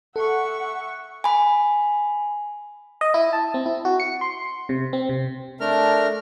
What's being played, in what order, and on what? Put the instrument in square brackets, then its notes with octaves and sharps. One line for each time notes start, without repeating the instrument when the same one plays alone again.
[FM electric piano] A4 [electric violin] E5 C#6 [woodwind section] F#5
[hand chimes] G#5 B5
[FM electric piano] D#5
E4
A5
C4
E4
F#4
C#7
C6
C3
C4
C3
[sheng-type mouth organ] A3 D4 A#4 A#5 F6